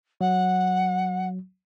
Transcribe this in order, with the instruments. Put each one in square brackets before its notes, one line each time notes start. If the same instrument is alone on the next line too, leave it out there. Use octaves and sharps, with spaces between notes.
[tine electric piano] F#3 [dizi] F#5